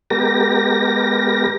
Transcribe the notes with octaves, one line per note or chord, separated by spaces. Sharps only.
G#3 B3 G4 A#4 A#6